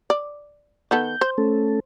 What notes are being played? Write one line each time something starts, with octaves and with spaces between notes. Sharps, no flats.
D5
D#3 B3 A4 G6
C5
A3 C#4 A4